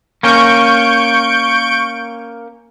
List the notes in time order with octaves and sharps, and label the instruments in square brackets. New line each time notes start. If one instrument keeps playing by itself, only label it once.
[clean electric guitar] A#3 C#4 [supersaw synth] C#6 G6 D7